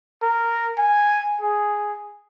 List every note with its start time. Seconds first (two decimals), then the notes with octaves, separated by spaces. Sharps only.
0.22 A#4
0.78 G#5
1.41 G#4